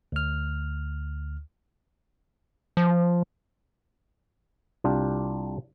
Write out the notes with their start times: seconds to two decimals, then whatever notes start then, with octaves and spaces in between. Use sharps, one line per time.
0.12 D2 F6
2.77 F3
4.84 C2 D4 F4 G4